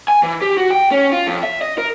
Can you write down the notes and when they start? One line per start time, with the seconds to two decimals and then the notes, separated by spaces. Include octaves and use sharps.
0.08 G#5
0.23 E3
0.42 G4
0.57 F#4
0.70 G5
0.91 C#4
1.12 F4
1.27 F2
1.43 E5
1.62 D#5
1.78 A#4